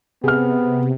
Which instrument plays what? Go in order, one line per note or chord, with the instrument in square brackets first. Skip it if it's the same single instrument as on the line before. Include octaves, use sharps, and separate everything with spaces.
[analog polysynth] C3 [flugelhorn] B3 [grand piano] G#4 F6